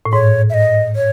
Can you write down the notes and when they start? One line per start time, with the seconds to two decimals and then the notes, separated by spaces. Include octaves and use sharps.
0.05 A2
0.13 G#2 C#5
0.50 E5
0.54 D#5
0.96 C#5